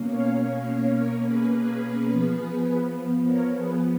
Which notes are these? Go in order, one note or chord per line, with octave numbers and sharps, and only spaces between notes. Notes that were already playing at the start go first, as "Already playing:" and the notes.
Already playing: B2 A#3 C#4
C#5 F5
C#5 F5
C#5 F5
A#4 C#5
G#4 B4
G#4 B4
F3 B3
A#4 C#5
G#4 B4